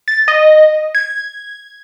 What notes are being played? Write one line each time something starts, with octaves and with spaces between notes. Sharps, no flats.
A6
D#5
G#6